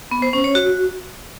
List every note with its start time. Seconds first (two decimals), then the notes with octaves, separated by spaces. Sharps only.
0.11 B3
0.22 C5
0.33 C#4
0.44 C#5
0.55 F#4